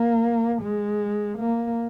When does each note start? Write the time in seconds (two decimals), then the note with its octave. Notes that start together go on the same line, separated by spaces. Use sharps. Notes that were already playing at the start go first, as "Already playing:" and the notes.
Already playing: A#3
0.63 G#3
1.39 A#3